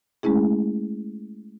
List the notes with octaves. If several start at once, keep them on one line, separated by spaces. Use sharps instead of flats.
G#3 A3 C#4 E4 G#4